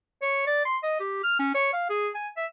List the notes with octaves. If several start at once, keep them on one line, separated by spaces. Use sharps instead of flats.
C#5
D5
C6
D#5
G4
F6
C#4
C#5
F5
G#4
G#5
E5